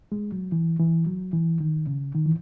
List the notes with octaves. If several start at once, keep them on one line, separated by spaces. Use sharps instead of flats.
G#3
F#3
E3
E3
F#3
E3
D#3
C#3
D#3
E3